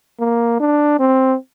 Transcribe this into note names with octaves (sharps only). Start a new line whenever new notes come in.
A#3
D4
C4